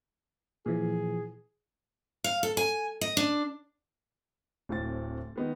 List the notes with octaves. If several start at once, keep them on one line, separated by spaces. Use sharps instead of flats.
A#2 E3 F3 G#4
F5
A4
G#5
D#5
D4
D1 A2 C4 A6
D#3 B3 D#4